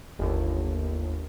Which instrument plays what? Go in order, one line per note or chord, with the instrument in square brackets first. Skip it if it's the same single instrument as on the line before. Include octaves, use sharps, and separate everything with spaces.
[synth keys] G1 D#2